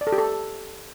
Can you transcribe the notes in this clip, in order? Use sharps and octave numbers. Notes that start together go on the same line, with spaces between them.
D5
A4
G4
A4